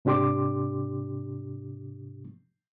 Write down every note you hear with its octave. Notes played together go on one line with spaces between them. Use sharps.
G#2 C3 D4 G4 C6 D6